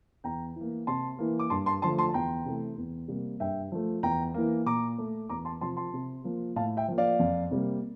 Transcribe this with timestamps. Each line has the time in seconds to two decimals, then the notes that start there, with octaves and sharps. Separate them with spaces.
0.24 E2 G5 A#5
0.56 E3 A#3
0.87 C3 A5 C6
1.19 E3 A#3
1.39 D6
1.50 G2 A5 C6
1.66 A5 C6
1.82 D3 F3 A3 A5 C6
1.98 A5 C6
2.09 A5
2.14 E2 G5 A#5
2.45 C3 E3 A3
2.78 E2
3.08 C3 G3 A#3
3.40 G2 E5 G5
3.72 F3 A3
4.03 E2 G5 A#5
4.34 E3 A#3
4.66 A#2 A#5 D6
4.98 A3
5.29 E2 A#5 D6
5.45 A5 C6
5.61 C3 F3 A5 C6
5.77 A5 C6
5.93 C3
6.24 F3 A#3
6.56 A2 F5 A5
6.77 E5 G5
6.88 F3 A#3
6.98 D5 F5
7.19 F2
7.51 C3 G3 A#3